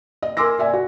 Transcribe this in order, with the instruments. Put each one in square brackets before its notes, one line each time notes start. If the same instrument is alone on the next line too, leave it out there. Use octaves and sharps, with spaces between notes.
[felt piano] D#5
A#4 G#5 C6 D6 E6 A#6
D5 E5 G#5
F#4